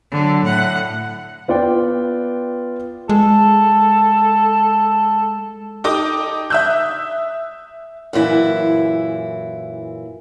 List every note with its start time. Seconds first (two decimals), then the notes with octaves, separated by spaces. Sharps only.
0.12 D3 F#3
0.45 A2 F#5
1.48 B3 F4 D5 G5
3.09 G#3 A4
5.84 D#4 G4 A4 D#5 D6
6.50 E5 D#6 E6 F#6 G6
8.13 F#2 A#2 E3 E4